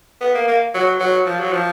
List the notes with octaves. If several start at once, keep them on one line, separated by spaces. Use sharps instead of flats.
B3
A#3
A#3
F#3
F#3
F3
F#3
F3